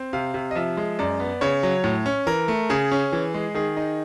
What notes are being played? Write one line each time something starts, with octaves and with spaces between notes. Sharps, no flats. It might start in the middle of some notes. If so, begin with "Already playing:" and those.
Already playing: C4
C3 F5
C3
D#5
F3 E5
G#3
F#2 D5
B3
C#3 C#5
F#3
A2
C#4
E3 A#4
A3
C#3 G#4
C#4
E3
G#3
D#3 G#4
D#4